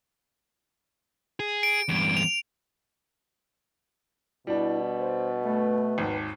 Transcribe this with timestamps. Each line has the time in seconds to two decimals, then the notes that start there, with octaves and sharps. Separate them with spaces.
1.40 G#4
1.63 D7
1.88 E2 G2
2.17 F7
4.47 B2 G3 D4 E4
4.99 C5
5.44 A3 B4
5.98 G#1 D#2